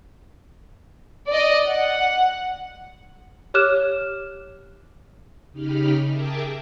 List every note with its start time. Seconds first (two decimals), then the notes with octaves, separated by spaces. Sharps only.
1.27 D5 D#5
1.67 F#5
3.54 G4 C#5 D6 F6 F#6 E7
5.52 C#3 D#4 G4 B5 F6
6.05 G#4 A#4 E5 G5 A5 D6